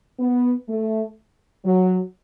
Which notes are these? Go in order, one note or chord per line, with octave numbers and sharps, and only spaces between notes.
B3
A3
F#3